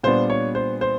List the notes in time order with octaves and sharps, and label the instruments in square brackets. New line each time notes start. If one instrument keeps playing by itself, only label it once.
[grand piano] A#2 G3 B3 D4 C5
C#5
C5
C5